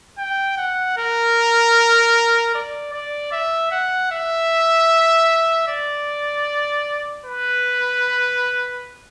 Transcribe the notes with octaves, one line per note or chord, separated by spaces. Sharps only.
G5
F#5
A#4
D5
D5
E5
F#5
E5
D5
B4